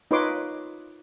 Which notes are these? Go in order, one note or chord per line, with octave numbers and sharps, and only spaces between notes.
D#4 F4 B4 C#5 C6 D6